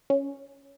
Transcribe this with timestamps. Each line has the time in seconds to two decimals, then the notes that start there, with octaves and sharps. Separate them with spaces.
0.10 C#4